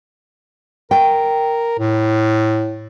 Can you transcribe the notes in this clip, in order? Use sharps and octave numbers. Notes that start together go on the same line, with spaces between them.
A#4 G5
A2